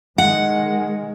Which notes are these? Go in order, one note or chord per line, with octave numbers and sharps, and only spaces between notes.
D#3 G#3 F#5